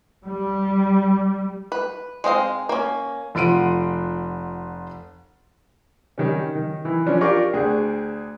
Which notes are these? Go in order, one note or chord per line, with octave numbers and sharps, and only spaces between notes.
G3
B4
G#3 C4 D#5 F5
A#3 C#4
F1 F4 F#5 D7 D#7
D#3 G3 C#4
D#3
E3
F3 C#4 D4
F4 G4 A#4 D5 C#6 D6
D2 D4 G#4 G5